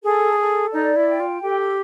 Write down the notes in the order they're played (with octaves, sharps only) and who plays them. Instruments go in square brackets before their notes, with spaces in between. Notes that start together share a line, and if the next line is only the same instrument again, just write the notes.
[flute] G#4 [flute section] A4
[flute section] A4
[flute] D#4 [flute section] D5
[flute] E4
[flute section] G5
[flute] F4
[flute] G4 [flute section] A4